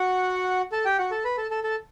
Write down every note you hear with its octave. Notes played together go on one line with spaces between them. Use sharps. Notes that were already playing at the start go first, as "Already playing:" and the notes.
Already playing: F#4 F#5
A4 A5
G4 G5
F#4 F#5
A4 A5
B4 B5
A4 A5
A4 A5
A4 A5